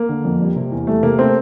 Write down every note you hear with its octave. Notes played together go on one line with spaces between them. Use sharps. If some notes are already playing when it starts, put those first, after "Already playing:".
Already playing: A#3
D3
F2
G3
C3
E2
G3 A3
C3 A#3
A3 C4